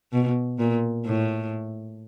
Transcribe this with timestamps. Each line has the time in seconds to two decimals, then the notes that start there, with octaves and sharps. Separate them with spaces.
0.12 B2
0.59 A#2
1.05 A2